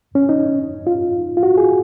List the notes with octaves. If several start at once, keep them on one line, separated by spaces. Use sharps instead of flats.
C#4
D#4
F4
F4
F#4
G#4